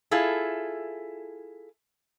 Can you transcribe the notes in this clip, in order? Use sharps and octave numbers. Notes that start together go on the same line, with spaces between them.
E4 F4 G#4 A4